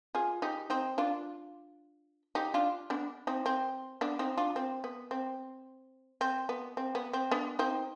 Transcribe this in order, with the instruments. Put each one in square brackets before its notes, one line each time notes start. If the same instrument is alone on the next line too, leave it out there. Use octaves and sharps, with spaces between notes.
[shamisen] F4 G#4
D#4 G4
C4 D#4
D4 F4
D#4 G4
D4 F4
B3 D4
C4 D#4
C4
B3 D4
C4 D#4
D4 F4
C4
B3
C4
C4
B3
C4
B3
C4
B3 D4
C4 D#4